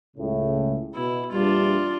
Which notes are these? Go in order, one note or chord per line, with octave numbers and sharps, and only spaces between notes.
C#2 A2 C#3
B2 E4
A#1 E2 G3 D4 F4